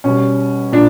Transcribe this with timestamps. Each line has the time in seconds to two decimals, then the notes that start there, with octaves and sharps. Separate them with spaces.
0.04 B2 G3 C#4
0.72 A#2 D4